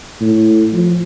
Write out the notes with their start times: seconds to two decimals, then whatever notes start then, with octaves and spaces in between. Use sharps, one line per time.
0.21 A2
0.73 F3